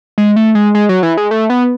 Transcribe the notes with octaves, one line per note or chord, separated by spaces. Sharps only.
G#3
A3
G#3
G#3
F#3
E3
G#3
A3
B3